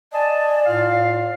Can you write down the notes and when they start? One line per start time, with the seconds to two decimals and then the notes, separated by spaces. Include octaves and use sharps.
0.13 D5 D#5 G#5 A5
0.66 A2 F4 F5